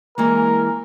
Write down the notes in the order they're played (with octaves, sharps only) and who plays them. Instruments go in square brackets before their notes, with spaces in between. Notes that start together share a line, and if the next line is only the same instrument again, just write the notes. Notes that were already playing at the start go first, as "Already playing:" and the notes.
[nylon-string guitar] E3 G#3 A#3 [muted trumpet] A#4